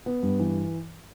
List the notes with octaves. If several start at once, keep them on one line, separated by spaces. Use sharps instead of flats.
B3
G2
E3